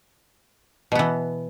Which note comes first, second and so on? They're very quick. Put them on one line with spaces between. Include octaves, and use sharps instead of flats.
B2 B3 E3